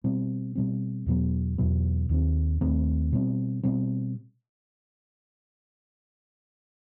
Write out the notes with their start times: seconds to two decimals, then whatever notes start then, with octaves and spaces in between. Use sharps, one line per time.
0.04 B2 G3 C4
0.55 B2 G3 C4
1.06 E2 B2 F#3 B3
1.58 E2 B2 F#3 B3
2.09 D#2 D#3 A3 C4
2.61 D#2 D#3 A3 C4
3.12 B2 G3 C4
3.63 B2 G3 C4